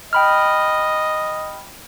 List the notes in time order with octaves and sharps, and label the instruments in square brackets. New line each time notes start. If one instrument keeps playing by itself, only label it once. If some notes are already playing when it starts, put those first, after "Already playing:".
[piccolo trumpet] D#5 [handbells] G5 B5 F6